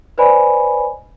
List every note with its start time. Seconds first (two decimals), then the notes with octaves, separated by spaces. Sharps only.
0.18 B4 C5 D5 D#5 G#5 B5